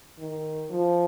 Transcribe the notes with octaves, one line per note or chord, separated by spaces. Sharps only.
D#3
F3